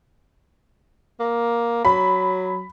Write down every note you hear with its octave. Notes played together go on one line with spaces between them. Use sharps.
A#3
F#3 B5